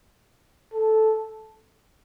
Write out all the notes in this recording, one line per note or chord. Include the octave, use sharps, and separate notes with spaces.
A4